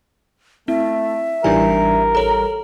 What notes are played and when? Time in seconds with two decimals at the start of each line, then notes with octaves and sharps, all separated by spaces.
0.68 A3 C4 E4 E5
1.44 A1 E3 G3 D4 D#4 A#4 G#5
2.15 A4 C#5 A#5